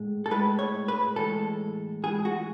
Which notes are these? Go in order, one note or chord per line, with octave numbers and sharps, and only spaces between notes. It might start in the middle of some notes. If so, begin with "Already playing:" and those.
Already playing: A2 G#3
A4
A2 G#3 B4
C#5
B4
A2 E3 G#3 A4
A2 E3 G#3 G#4
F#4